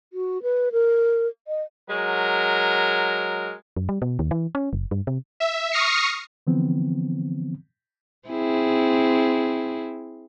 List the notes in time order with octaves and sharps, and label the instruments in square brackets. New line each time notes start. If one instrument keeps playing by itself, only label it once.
[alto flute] F#4
B4
A#4
D#5
[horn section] F#3 G#3 A#4
[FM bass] F#2
G3
B2
D#2
E3
C#4
F#1
G2
C3
[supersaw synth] E5
C#6 D#6 F6 A#6 C7 C#7
[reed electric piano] D3 E3 F3 B3 C4
[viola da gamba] C4 E4 G#4